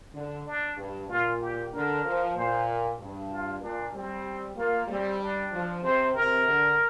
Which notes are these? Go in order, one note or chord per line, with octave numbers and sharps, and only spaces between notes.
D3
D4
G2
A#2 F4
G4
D3 A#4
F3
A#2 C5
G2
F4
A#2 D4
G3 C4
A#3 F4
G3 C4
D4
F3
C3 C5
C3 A#4
D3